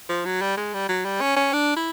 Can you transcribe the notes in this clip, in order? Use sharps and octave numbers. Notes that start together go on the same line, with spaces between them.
F3
F#3
G3
G#3
G3
F#3
G3
C#4
C#4
D4
E4